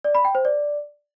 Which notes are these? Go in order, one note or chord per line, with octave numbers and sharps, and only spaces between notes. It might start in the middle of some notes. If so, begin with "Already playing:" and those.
D5
B5
G5
C5
D5